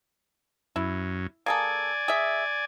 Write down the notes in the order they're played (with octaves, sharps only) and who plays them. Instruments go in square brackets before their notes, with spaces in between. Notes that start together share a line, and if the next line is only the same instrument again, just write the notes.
[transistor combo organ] F#2 [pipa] E4
[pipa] A#3 G#4 A4 [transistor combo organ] D5 G#5
[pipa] G#4 E5